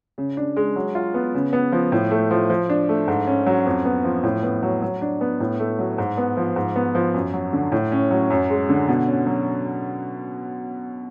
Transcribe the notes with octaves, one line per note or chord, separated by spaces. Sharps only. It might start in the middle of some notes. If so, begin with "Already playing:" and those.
C#3
D4
G#3
F#3
F4
B3
C#3
B3
F3
A2
A3
F3
F3
D4
A3
G#2
C#4
F#3
F2
B3
F3
A2
B3
F#3
F#3
D4
B3
A2
A3
F#3
G#2
B3
F3
G#2
B3
F3
F#2
F#3
D3
A2
C#4
F#3
F#2
G#3
D3
B2
C#4
F#3